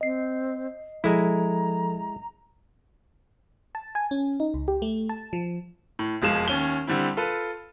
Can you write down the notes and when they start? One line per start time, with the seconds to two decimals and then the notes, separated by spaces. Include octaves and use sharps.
0.01 C4 D#5 C7
1.04 F3 G#3 E4 A4 A#5
3.75 A5
3.95 G#5
4.11 C#4
4.40 D#4
4.54 C#2
4.68 G4
4.82 A3
5.09 A5
5.33 F3
5.99 A2
6.22 E1 F2 G#3 F5 E7
6.48 D#2 C#4 G7
6.87 D3 G3 C4 E4
7.17 F4 A4 B4